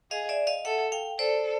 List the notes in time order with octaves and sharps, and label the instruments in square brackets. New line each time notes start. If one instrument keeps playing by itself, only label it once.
[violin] G#4 [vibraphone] D#5 F5
[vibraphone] D5 E5
D#5 F5
[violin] A4 [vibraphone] E5 F#5
[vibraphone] F5 G5
[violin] A4 [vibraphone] C5 D5